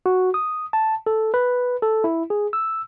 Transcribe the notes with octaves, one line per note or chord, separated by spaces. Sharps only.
F#4
D#6
A5
A4
B4
A4
E4
G#4
E6